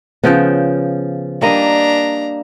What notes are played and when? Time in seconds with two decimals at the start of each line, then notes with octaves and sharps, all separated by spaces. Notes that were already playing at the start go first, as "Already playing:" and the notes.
0.23 C#3 F3 B3 C#4 G5
1.41 G3 A#3 D4 D#5 A#5